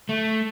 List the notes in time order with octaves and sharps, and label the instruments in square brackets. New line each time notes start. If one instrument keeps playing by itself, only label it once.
[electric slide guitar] A3